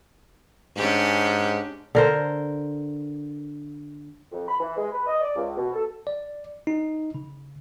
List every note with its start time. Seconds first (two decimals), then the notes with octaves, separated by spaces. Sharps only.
0.77 G#2 C#4 D4 G4
1.95 D3 A#4 C5
4.32 F2
4.48 B5
4.60 E3
4.77 G#3
4.92 B4
5.07 D#5
5.21 D5
5.36 C#2
5.57 B2
5.73 A4
6.07 D5
6.67 D#4
7.14 C#3